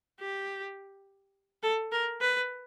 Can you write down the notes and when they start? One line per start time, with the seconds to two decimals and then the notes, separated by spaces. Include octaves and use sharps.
0.20 G4
1.63 A4
1.92 A#4
2.21 B4